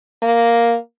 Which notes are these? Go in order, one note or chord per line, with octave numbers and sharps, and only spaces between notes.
A#3